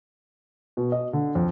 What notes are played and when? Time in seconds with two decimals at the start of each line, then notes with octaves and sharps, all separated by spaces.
0.77 B2
0.92 D#5
1.13 D3
1.35 F2